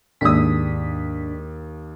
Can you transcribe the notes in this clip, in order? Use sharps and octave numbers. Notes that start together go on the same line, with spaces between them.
D#2 G#2 D4 D#6 B6